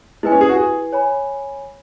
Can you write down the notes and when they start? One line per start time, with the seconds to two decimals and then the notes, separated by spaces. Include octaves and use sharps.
0.23 G#3 E4 B4 G#5
0.32 C#4
0.41 G#4
0.49 F#4
0.57 G#4
0.93 C#5 G#5 B5